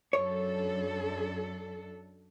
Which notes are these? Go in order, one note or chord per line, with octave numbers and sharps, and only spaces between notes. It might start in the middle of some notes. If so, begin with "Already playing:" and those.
F#2 D4 A4 C#5